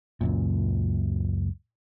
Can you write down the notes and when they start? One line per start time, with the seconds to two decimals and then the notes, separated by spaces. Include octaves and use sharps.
0.21 C#2 F#2 A#2